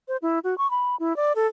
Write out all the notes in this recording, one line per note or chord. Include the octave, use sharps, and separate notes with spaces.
C5
E4
F#4
C#6
B5
E4
D5
A4